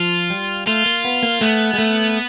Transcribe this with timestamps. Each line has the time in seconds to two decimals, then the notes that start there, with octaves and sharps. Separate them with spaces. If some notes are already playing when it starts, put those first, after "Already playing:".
Already playing: F3 F4
0.30 G3
0.67 A3 F4
0.86 A#3
1.05 B3
1.23 A#3
1.41 A3 B3
1.73 G#3
1.78 A3